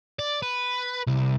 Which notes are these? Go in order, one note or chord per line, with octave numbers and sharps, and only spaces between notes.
D5
B4
C2